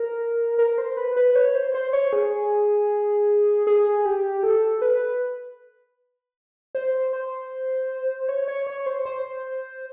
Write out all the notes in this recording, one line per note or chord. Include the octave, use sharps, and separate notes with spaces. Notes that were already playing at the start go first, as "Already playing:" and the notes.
Already playing: A#4
A#4
C5
B4
B4
C#5
C5
C5
C#5
G#4
G#4
G4
A4
B4
C5
C5
C#5
C#5
C#5
C5
C5